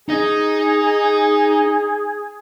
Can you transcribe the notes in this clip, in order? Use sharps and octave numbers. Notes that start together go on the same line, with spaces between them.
D#4 G#4 D#5